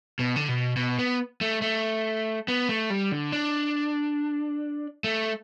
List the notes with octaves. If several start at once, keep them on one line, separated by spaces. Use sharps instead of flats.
B2
D3
B2
B2
B3
A3
A3
B3
A3
G3
D3
D4
A3